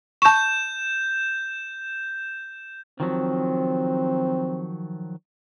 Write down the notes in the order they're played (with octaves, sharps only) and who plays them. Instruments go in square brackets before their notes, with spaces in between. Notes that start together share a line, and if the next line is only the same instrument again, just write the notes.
[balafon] A5 C#6 [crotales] G6 E7
[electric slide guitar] D#3 F3 F#3 [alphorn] C4